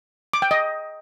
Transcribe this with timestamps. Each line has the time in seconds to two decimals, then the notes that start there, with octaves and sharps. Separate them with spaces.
0.33 D6
0.42 G5
0.51 D#5